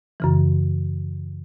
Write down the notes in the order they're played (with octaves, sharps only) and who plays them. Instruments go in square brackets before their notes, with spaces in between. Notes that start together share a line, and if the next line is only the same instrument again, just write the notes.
[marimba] F#2 C#3 E3